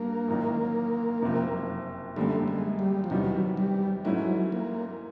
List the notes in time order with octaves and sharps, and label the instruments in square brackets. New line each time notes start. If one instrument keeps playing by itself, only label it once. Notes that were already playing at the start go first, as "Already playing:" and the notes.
Already playing: [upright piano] G2 G3 [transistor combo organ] A#3
[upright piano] A1 G#2 D#3 F#3
F#1 F2 C3
[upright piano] F#2 D3 G3 A#3 [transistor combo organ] A3
[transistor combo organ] G#3
G3
F3
[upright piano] E2 C3 D#3 G3 [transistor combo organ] F#3
[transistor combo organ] G3
[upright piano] G#2 E3 A3 C#4 E4 [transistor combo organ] F#3
[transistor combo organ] A#3